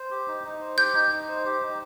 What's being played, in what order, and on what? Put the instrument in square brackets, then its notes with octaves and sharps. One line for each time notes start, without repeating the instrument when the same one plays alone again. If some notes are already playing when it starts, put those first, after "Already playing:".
Already playing: [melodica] C5
G4
D#4
D#4
C5
[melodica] G4 [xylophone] G6
[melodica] D#4
D#4
C5
G4
D#4